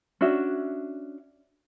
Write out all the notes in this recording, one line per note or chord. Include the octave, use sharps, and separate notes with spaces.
C#4 D4 F#4 E5